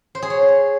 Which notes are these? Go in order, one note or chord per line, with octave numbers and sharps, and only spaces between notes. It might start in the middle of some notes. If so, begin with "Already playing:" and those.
C5
G#4
C#5